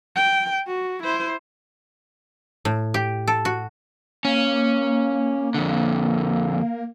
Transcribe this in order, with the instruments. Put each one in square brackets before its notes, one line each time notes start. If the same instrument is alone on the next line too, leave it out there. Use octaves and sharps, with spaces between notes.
[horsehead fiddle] G5
F#4
E4 C5
[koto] A2
G4
A4
F#4
[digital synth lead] A#3 [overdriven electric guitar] C#4
[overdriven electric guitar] F2 D3